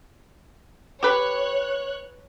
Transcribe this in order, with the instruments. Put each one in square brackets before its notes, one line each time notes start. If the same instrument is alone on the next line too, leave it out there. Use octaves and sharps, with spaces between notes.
[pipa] G4 B4 [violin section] C#5 F#6